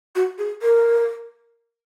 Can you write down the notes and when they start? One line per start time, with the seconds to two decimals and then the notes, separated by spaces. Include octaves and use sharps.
0.15 F#4
0.38 G#4
0.62 A#4